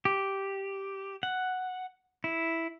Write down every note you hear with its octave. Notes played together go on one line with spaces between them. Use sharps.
G4
F#5
E4